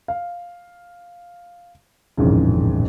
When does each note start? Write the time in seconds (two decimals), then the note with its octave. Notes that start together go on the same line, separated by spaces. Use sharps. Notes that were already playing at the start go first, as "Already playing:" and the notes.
0.08 F5
2.17 D#1 A1 F2 G#2 C#3